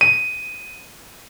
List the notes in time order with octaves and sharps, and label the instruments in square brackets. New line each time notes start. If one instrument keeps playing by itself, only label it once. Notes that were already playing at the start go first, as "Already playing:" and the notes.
[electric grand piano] D#7